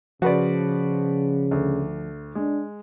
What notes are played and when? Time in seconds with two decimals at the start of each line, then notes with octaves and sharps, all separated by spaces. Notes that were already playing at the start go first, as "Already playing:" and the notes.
0.22 C#3 F3 F#4 B4 D5
1.51 D2
2.35 G#3 D4